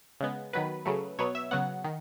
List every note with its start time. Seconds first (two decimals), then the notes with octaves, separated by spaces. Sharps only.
0.20 C#3 G#3 B3
0.53 D#3 F#3 B3 B4
0.85 C#3 F#3 A3
1.19 B2 F#3 B3 C#5
1.35 E5
1.51 C#3 F#3 B3 F#5
1.84 D#3